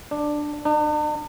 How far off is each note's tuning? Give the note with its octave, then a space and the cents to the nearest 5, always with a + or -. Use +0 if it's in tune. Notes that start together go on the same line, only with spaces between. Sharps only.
D4 +10
D4 +45